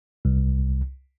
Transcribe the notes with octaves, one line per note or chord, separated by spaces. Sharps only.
C2